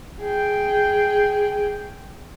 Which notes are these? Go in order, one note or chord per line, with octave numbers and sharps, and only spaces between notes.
G#4 G5